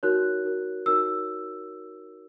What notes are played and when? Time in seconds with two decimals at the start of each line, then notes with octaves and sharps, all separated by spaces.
0.03 D#4 F#4 A#4 C#5 F#6
0.45 D#4 F#4 A#4 C#5
0.86 D#4 F#4 A#4 C#5 E6